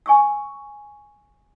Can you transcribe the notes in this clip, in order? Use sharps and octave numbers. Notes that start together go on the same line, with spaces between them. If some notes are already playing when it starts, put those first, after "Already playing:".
G#5 C#6 E6